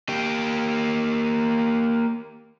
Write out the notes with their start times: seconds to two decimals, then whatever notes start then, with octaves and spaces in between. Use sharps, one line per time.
0.09 A#3 G4